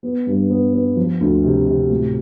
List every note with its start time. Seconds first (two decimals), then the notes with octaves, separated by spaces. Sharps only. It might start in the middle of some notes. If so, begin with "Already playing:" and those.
0.03 B3
0.27 G2
0.50 B3
0.73 B3
0.96 F3
1.21 D2
1.44 C3
1.67 C3
1.90 A2